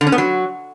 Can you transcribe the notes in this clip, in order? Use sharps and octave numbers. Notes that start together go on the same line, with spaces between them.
D3
C#4
B3
F#3